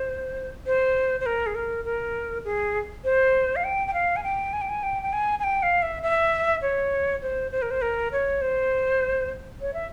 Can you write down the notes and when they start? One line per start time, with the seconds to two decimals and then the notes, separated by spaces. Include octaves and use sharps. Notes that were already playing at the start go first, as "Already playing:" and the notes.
Already playing: C5
0.66 C5
1.20 C5
1.26 A#4
1.46 G#4
1.55 A#4
1.85 A#4
2.45 G#4
3.05 C5
3.56 F5
3.64 G5
3.87 G5
3.94 F5
4.16 G#5
4.24 G5
4.53 G#5
4.61 G5
4.69 G#5
4.83 G5
5.03 G5
5.13 G#5
5.39 G#5
5.44 G5
5.63 F5
5.82 E5
6.03 E5
6.62 C#5
7.22 C5
7.52 C5
7.62 A#4
7.71 C5
7.82 A#4
8.12 C#5
8.41 C5
9.61 C#5
9.74 E5